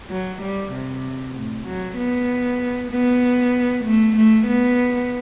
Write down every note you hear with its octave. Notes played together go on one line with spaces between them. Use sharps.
F#3
G3
C3
A2
F#3
B3
B3
A3
A3
B3